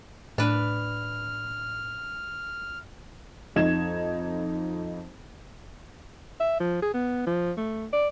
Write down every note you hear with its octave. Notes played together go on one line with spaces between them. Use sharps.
A2 D4 B4 F6
F2 D#4 G#6 E7
E5
F3
G#4
B3
F3
A3
D5